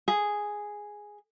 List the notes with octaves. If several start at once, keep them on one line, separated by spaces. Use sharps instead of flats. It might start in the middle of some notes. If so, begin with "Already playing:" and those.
G#4